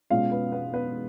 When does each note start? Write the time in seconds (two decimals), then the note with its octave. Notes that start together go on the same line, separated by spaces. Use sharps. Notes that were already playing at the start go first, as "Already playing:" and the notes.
0.10 B2 G#3 C#4 F4 F5
0.31 B3 B4
0.52 B3 B4
0.73 B3 B4